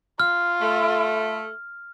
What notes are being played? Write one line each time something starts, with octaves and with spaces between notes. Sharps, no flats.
F4 F6
A3